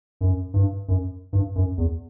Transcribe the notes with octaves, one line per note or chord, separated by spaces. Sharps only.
F#2
G2
F#2
G2
F#2
E2